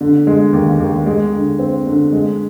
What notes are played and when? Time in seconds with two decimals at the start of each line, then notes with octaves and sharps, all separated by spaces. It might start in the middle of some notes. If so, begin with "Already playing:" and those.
0.01 D3
0.27 G#3
0.53 D#2
0.80 D#2
1.06 G#3
1.33 D3
1.59 C4
1.86 D3
2.13 G#3